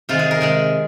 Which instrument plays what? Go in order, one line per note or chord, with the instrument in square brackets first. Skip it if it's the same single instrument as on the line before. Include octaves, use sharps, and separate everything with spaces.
[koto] C3 D#3 G#3 F4
G#4
A#4
C3 D#3 G#3 G#4